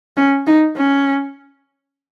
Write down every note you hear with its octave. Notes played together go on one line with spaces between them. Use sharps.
C#4
D#4
C#4